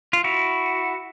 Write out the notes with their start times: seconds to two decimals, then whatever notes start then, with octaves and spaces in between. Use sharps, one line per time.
0.13 F4
0.24 E4 F#4